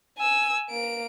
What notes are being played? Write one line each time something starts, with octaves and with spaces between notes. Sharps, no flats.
G#5 E6
A#3 D7